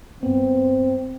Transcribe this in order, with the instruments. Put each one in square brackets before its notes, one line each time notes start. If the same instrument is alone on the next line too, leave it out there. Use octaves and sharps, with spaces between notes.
[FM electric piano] G2 B3 [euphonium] C4